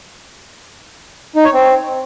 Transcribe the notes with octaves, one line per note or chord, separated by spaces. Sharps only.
D#4
C#5
C4